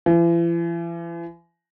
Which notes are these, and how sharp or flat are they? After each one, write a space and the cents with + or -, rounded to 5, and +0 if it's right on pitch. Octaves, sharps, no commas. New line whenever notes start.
E3 +45